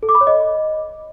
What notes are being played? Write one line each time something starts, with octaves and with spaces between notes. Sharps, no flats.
A4
D6
B5
C#5
D#5